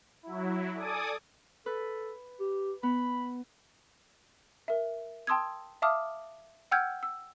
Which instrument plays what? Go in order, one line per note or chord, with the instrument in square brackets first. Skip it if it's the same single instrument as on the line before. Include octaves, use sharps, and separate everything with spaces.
[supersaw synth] F#3 E4
A4 D5 G#5 D6 D#6
[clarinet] A4 [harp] B4
[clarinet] G4
[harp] B3 [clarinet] B5
[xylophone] A#4 E5
G5 A5 C6 D#6 E6 G#6
E5 F5 A5 D6 D#6 F6
F#5 G5 E6 F6 G6 G#6
E6